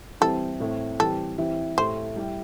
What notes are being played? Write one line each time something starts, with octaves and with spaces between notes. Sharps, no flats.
E3 G3 C4 E4 A4
A2 A3 C4 E4
E3 G3 C4 G4 A4
E3 C4 E4 G4
A2 A3 E4 G4 C5
G3 E4 G4